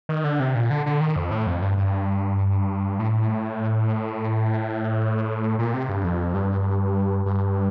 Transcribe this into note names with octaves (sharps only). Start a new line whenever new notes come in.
D#3
D3
C3
A#2
D3
D3
D#3
F2
A2
F2
G2
G2
A2
A#2
C3
G2
F2
G2
G2